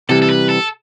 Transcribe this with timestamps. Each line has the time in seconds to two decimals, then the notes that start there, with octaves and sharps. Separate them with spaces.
0.09 C3 E3 G3 A4
0.22 A4
0.29 B4
0.49 A4